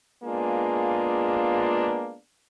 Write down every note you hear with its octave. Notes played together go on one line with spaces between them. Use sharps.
G#3 A#3 B3 D4 F4 G#4